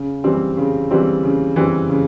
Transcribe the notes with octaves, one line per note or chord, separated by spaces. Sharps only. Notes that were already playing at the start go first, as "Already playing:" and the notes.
Already playing: C#3
E3 G3 C4
C#3
E3 G3 C4
C#3
E3 G3 C4
C#3